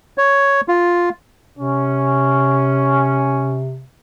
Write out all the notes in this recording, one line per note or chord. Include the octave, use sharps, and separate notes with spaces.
C#5
F4
C3 C#4